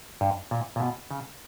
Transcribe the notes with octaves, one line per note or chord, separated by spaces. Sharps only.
G2
A#2
A#2
B2
C#3